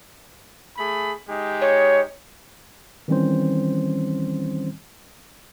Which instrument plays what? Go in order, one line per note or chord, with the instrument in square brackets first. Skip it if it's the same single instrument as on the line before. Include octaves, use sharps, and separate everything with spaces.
[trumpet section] A3 G#4 B5
G#3 D#4 G4
[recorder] C#5
[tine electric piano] D#3 E3 G3 C4 C#4 C5